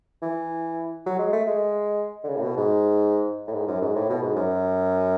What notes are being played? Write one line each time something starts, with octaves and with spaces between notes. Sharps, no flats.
E3
F#3
G#3
A3
G#3
D3
C#3
A2
B2
G#2
A2
G#2
F#2
G#2
A2
B2
G#2
F#2